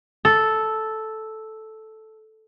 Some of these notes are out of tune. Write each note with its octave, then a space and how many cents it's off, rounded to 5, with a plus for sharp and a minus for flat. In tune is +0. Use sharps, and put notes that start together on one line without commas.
A4 -5